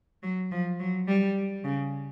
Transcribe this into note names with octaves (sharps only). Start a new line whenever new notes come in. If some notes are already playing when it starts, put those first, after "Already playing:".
F#3
F3
F#3
G3
C#3